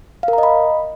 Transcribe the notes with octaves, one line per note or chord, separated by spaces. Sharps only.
F5
A#4
A#5
D#5
B5